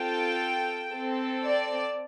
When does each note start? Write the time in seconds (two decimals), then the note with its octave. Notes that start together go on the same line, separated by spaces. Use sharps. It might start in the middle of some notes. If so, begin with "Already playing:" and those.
Already playing: C4 F4 A4 G5
0.90 C4 A4
1.44 D5